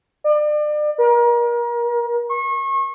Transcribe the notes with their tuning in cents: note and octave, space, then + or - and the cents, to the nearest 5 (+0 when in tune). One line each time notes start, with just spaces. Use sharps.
D5 +35
A#4 +35
C#6 -35